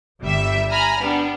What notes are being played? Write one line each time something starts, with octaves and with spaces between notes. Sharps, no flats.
G1 G3 E5
G#5 A#5 B5 F6
G3 B3 D4